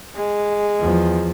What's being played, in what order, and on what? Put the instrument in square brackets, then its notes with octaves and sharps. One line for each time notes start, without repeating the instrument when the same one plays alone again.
[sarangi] G#3
[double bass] E2 F3